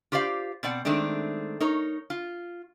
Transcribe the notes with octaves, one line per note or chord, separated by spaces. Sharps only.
F4 G4 C5 D5 F5
B2 C4 D5 F#5
D#3 G#3 A3 C4 D4
D#4 A#4 C#5
F4